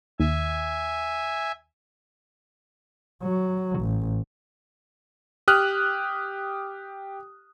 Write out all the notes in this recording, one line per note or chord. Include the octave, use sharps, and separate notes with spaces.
D#2 E5 G#5
F#3
A1
G4 D#6 F6 F#6